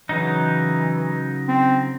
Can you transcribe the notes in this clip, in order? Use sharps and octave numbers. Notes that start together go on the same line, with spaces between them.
C#3 E3 F#3 D#4
C4